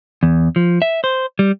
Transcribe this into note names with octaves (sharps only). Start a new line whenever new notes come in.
E2
F3
E5
C5
G3